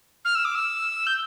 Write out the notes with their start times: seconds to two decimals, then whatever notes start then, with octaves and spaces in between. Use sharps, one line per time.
0.25 F6
0.35 E6
0.45 D6
0.55 E6
1.06 G6